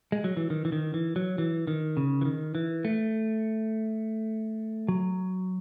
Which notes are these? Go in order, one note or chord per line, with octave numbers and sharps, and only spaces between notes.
G#3
F#3
E3
D#3
E3
D#3
E3
F#3
E3
D#3
C#3
E3
D#3
E3
A3
F#3